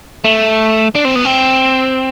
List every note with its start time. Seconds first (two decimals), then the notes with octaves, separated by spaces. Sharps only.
0.24 A3
0.95 D4
1.05 C4
1.15 B3
1.25 C4